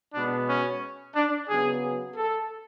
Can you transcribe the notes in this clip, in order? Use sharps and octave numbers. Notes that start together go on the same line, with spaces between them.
B2 G#3 B3 D4
C#4
D4
C#3 F#3 B3 G#4
A4